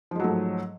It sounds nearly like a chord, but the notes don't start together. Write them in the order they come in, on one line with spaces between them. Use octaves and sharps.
F3 G#3 F#3 A3 G#2